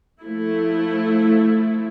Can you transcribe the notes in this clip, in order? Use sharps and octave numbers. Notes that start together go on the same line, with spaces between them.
F3 A3 E4